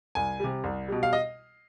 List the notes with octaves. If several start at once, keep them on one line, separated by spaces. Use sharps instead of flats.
C2 G#5
C3 G3
C2
B2 G3
F5
D#5